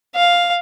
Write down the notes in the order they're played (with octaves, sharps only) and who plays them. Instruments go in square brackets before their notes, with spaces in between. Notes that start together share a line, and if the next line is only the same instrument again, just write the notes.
[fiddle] F5